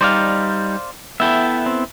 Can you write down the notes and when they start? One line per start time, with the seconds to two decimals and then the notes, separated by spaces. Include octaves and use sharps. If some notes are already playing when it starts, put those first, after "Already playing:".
0.01 G3 D#4 C5 D5 F5
1.20 B3 E4 A4 E5 G5
1.66 C4